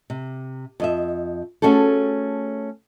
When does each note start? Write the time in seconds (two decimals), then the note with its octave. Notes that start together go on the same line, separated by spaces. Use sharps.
0.10 C3
0.80 F2 D#5 E5
1.62 A3 C#4 F#4 G#4 A4